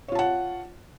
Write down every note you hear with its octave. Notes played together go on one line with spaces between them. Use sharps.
F4 C#5 F#5 A5